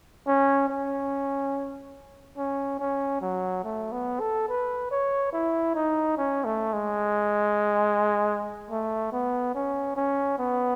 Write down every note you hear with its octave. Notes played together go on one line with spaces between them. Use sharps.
C#4
C#4
C#4
C#4
F#3
A3
B3
A4
B4
C#5
E4
D#4
C#4
A3
G#3
A3
B3
C#4
C#4
B3